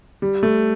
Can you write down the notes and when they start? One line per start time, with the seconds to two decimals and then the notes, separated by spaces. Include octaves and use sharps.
0.22 G3
0.43 A3